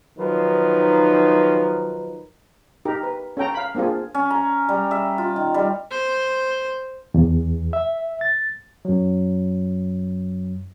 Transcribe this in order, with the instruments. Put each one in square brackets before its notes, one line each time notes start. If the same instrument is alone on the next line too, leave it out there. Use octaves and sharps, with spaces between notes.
[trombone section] D#3 F3 F#3 D#4 A#4 B4
[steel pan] D#4 G4 A#4
B4
C#4 A4 G5 A#5
F5 B5
A#3 C4 D4 F4 G#4
[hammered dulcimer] C#4
A#5
G3
E5
F4
D#3
G3
[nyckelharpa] C5
[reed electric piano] E2
E5
A6
[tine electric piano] F#2 F#3